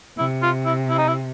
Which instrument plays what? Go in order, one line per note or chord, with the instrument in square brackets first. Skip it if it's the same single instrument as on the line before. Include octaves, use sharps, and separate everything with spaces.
[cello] C3 [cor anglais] E4
[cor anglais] F4
E4
E4
D#4
E4